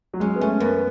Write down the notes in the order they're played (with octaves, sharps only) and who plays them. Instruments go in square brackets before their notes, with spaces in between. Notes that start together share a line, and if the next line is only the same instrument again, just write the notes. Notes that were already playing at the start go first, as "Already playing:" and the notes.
[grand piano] F#3
[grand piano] G#3 [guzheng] C#4
[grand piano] B3
[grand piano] A3 [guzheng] C#4
[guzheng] F#2 [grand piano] B3